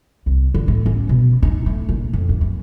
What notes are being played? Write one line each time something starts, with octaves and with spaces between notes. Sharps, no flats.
C2
D3
A2
C#4
B2
D#4
A3
A#1
F2
G2
F#2